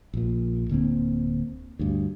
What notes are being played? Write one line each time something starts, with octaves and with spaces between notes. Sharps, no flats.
A#1 A#2
D1 D3 A#3 C4
D2 G2